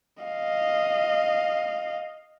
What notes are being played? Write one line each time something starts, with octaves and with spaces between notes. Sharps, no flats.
D#5 F5